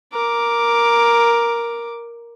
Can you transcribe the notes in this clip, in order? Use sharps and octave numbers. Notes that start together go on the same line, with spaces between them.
A#4 D6